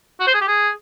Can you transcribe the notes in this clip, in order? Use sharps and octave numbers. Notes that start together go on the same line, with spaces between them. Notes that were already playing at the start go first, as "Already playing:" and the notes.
F#4
C5
G#4
G4
G#4